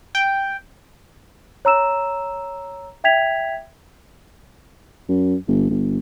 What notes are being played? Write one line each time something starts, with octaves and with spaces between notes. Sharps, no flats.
G5
C#5 A#5 E6 E7
E5 G5 G#6 B6 F7
F#2
G1
G1